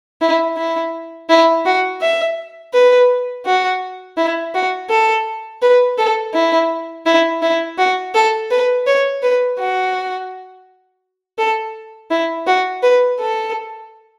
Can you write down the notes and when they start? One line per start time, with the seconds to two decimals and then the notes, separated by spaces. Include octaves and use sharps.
0.21 E4
0.57 E4
1.29 E4
1.65 F#4
2.01 E5
2.73 B4
3.46 F#4
4.17 E4
4.54 F#4
4.90 A4
5.62 B4
5.98 A4
6.34 E4
7.06 E4
7.42 E4
7.78 F#4
8.14 A4
8.51 B4
8.87 C#5
9.23 B4
9.59 F#4
11.38 A4
12.10 E4
12.47 F#4
12.83 B4
13.19 A4